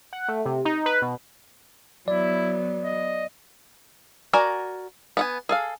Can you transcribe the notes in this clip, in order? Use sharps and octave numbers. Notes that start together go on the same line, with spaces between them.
F#5
A3
C3
D#4
B4
B2
F#3 B3 E4 D5
D#5
F#4 A#4 D5 G#5
B3 F#5 G#5
G#4 A4 F5